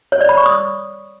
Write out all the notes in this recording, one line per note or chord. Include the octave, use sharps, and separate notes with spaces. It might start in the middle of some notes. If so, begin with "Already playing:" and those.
C#5
D5
B5
C#6
D#6